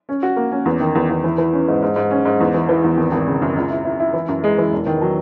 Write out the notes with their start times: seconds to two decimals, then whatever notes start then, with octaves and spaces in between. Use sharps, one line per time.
0.09 C#4
0.23 F#4
0.37 A#3
0.51 C#4
0.65 E2
0.80 D#3
0.95 E2
1.10 E2
1.24 E3
1.38 E3
1.53 C#4
1.68 G#2
1.82 G#2
1.96 G#2
2.11 C#4
2.25 G#2
2.40 E2
2.54 E3
2.69 E3
2.84 E2
2.98 G#1
3.12 G#1
3.27 C#3
3.42 F#2
3.57 C#2
3.70 E4
3.84 E4
4.00 E4
4.14 E3
4.28 F#2
4.44 G#3
4.58 E3
4.71 E1
4.86 D#3
5.02 F#3